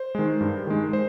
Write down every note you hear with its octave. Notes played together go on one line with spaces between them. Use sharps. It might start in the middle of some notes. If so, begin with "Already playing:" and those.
Already playing: C5
D#3 G#3
G2
D#3 G#3
C5